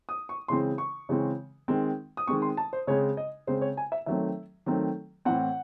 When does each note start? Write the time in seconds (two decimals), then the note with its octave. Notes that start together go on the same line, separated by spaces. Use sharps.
0.09 D#6
0.29 C#6
0.48 C#3 E3 G#3 C4 C6
0.78 C#6
1.09 C#3 E3 G#3 C4
1.68 D#3 G#3 C4
2.17 D#6
2.27 D#3 G#3 C4 C#6
2.42 C6
2.57 A5
2.73 C5
2.87 C#3 G#3 C4 C#5
3.17 D#5
3.47 C#3 G#3 C4 C5
3.62 C#5
3.77 G#5
3.92 E5
4.06 D#3 F#3 A3 C4 E5
4.66 D#3 F#3 A3 C4
5.25 A2 E3 C4 F#5